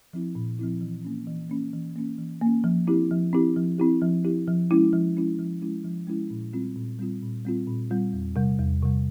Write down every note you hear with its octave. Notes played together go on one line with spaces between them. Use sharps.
F3 C4 E4
A#2
F3 C4 E4
E3
A#3 C#4
E3
A#3 C#4
E3
A#3 C#4
E3
A#3 C#4
F3
C4 E4 G4
F3
C4 E4 G4
F3
C4 E4 G4
F3
C4 E4 G4
F3
G#3 C#4 E4
F3
G#3 C#4 E4
F3
G#3 C#4 E4
F3
G#3 C#4 E4
A#2
G3 C4 F4
A#2
G3 C4 F4
A#2
G3 C4 F4
A#2
G3 C4 F4
E2
C3 G3
E2
C3 G3